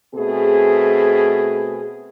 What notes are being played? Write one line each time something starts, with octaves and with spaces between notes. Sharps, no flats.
B2 A3 C4 G#4